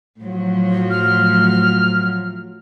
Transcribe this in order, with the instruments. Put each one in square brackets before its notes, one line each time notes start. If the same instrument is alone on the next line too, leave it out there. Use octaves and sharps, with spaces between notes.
[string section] A2 F3 F#3
[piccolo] F6